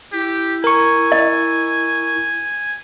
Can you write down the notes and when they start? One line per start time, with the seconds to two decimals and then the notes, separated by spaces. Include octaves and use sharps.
0.13 E4 G4
0.64 A#4 G#5 C#6
1.12 D#5